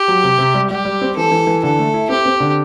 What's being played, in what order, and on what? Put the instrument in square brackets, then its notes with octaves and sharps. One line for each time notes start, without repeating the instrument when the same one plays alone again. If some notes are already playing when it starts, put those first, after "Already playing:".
Already playing: [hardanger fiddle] G4
[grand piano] F#3
C3
C3
G3
[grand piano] G3 [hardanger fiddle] G4
[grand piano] G3
C4
[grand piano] E3 [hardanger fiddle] A4
[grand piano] E3
E3
[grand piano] D3 [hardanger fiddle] A4
[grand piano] A3
E4
[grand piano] C4 [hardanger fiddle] G4
[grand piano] C4
D3